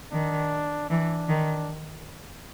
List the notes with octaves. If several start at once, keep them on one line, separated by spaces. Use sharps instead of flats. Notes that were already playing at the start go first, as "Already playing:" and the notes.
D#3 D4
E3 D4
D#3